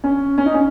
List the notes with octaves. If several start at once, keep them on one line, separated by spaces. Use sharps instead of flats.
C#4
C#4
D#4
C#4